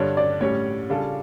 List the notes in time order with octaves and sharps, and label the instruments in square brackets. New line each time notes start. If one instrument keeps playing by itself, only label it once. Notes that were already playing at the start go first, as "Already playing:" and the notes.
Already playing: [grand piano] G2 D3 G3 D4 [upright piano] C#5
[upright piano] D5
[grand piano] A2 G3 C#4 [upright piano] C#5
[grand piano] C#3 G3 D4 F4 A4